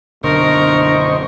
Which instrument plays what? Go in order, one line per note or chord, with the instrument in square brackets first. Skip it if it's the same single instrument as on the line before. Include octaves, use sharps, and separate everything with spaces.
[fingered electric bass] F#1 B1 D3 [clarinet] D4 [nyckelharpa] A#4 [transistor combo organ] C5 D#5 C#6